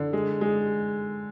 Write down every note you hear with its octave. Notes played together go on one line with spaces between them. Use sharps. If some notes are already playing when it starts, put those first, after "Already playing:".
Already playing: D3
G#3
G#3